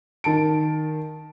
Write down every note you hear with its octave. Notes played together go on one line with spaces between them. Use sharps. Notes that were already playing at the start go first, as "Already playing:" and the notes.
D#3 A5 D7